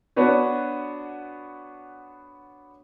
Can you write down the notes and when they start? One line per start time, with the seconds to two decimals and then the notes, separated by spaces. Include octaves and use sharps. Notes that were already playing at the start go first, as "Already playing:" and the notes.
0.16 B3 D4 F#4 B4 C#5